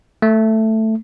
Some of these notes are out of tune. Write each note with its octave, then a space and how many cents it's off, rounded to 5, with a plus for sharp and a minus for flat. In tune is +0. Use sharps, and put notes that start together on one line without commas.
A3 +5